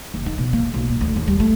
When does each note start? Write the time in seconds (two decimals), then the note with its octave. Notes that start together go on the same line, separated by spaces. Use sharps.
0.14 F#1
0.26 D#4
0.38 B2
0.53 A#3
0.74 B1
0.90 A#2
1.01 D2
1.16 D#2
1.28 G3
1.40 A3